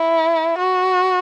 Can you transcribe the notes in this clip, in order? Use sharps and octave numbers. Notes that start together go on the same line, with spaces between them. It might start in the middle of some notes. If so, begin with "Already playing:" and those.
Already playing: E4
F#4